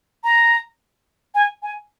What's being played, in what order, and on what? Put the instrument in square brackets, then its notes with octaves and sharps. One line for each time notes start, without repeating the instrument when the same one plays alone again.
[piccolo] A#5
G#5
G#5